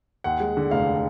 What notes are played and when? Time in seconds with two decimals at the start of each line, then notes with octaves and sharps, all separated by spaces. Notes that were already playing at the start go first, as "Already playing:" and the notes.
0.24 D#2 F#5
0.40 G#3
0.57 D3
0.71 F1 F5